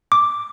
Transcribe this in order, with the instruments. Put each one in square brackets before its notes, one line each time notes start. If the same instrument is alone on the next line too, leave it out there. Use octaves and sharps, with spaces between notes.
[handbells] D6